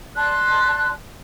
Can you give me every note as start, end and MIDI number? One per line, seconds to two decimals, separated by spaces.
0.16 0.89 74
0.16 0.89 81
0.16 0.89 84
0.16 0.89 90